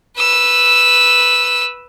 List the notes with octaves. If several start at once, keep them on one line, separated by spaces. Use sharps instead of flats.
B4 E6